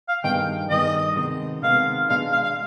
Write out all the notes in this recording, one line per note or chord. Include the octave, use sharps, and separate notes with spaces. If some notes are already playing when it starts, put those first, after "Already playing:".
F5
G2 D#3 B3 D#4 G#4 G5
G2 D#3 B3 D#4 G#4 D#5
C3 D#3 G#3 B3
C3 D#3 G#3 B3 F5
B2 G#3 D4 F5
F5
F5